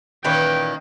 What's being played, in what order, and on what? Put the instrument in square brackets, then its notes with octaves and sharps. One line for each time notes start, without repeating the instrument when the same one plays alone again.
[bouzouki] A#2 E3 B4 [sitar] D#3 A#3 C#4 [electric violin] G5